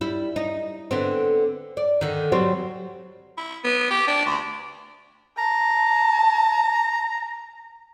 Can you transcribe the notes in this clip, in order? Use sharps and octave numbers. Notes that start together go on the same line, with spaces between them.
G3 E4
D#4
D3 B3 C4
D5
D3 D#3
F#3 G3 C4
E4
B3
G4
D4
D2
A5 A#5